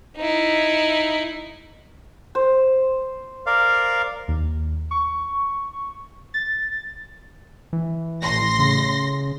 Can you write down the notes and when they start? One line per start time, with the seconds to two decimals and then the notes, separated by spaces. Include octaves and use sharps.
0.16 D#4 E4
2.35 C5
3.46 A#4 D5 F5
4.28 D#2
4.91 C#6
6.34 A6
7.73 E3
8.22 A1 C6 A#6
8.59 C#3